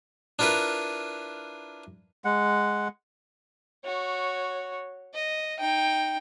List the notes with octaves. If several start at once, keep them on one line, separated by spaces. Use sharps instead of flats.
D4 E4 F4 A#4 B4
G#3 F#5
F#4 C#5
D#5
D#4 G5